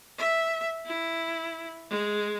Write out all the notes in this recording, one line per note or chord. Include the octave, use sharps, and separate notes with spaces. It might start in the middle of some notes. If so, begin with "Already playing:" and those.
E5
E4
G#3